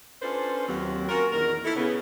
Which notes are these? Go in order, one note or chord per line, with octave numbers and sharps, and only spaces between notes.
C#4 D4 F4 A4 B4 C5
D#2 F#3 C4
C#4 F4 F#4 A#4
E2 A#2 D#3 A#4
E4 A4
C#3 B3